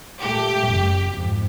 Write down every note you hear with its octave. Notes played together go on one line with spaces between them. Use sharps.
A#2 A3 G4
F#1 F#2
F2 G#2